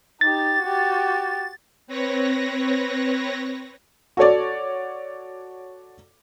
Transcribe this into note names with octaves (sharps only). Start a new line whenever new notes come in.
D#4 G4 A6
F#4 G4
C4 B4 C#5 A#6
F#4 A4 C#5 D5